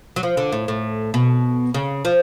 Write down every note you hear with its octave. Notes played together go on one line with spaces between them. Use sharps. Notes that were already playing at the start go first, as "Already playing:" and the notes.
F#3
F3
D3
A2
A2
B2
C#3
F3